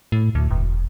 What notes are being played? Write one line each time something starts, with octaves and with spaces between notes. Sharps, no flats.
A2
D2
E1